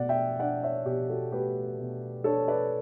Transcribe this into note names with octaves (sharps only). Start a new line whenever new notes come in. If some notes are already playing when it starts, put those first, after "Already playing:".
Already playing: B2 A3 D5 F#5
E5 G5
D4 D5 F#5
C#5 E5
B2 G4
F#4 A4
A3 G4 B4
B2
D4 A4 C#5
B4 D5